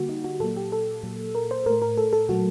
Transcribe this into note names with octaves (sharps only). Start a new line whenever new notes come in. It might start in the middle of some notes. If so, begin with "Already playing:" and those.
Already playing: D3 G3 A#3 F#4 G4
D#4
F#4
A#2 F#3 A#3 A4
G4
A4
A#2 F#3 A#3
A#4
C5
A2 A3 A#4
A#4
A4
A4
A#2 F#3 A3 F#4